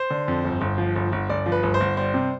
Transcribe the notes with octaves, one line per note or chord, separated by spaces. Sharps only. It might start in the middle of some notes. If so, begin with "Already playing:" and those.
Already playing: C5
D3
F2
G1
G1
F3
G1
G1
G1 D5
F3
B4
G1
C5
G1
G3 C5
C3